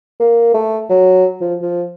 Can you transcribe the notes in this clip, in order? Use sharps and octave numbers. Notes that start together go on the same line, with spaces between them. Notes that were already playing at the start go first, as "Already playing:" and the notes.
A#3
A3
F#3
F3
F3